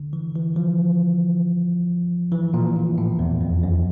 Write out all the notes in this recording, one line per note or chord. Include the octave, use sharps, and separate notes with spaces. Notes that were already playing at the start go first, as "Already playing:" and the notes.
Already playing: D3
E3
E3
F3
E3
A#2
A#2
A2
E2
F2
F#2